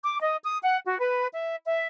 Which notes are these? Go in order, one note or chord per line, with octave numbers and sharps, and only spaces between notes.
D6
D#5
D#6
F#5
F#4
B4
E5
E5